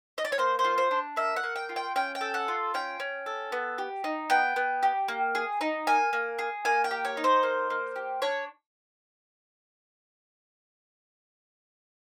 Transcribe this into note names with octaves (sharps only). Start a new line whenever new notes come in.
D#5
D5
C#5
A#3 C5
C5
F4
C5
D4
A#3 E5
F#5
A#3
G5
F4
G5
C#4 G5
G5
A4
F#5
F4
C#4 G5
C#4
A4
B3
G4
D#4
B3 G5
B3
G4
A#3
G#4
D#4
A#3 G#5
A#3
G#4
A#3 G#5
G5
G4
C#5
D#4
C5
A#3
A#3
G4
D4 C#5